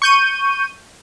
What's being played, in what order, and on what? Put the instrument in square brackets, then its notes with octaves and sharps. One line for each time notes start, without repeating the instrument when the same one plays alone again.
[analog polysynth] C#6 G6 D#7